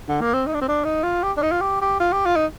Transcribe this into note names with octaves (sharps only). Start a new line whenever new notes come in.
D3
A#3
C4
D#4
D4
C4
D4
D#4
F4
G4
D4
D#4
F4
G4
G4
F4
G4
F4
D#4